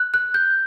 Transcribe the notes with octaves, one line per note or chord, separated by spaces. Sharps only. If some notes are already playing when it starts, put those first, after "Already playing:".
Already playing: F#6
F#6
G6